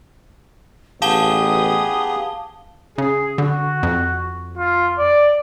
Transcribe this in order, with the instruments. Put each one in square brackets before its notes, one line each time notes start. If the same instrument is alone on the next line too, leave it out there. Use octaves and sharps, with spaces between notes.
[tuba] A1 [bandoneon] B3 G4 G#4 [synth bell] F5 A5 G7 [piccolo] D#6
[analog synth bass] C#3 [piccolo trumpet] G#4
[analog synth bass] D3 [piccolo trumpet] F#4
[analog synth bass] F2
[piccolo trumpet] F4
D5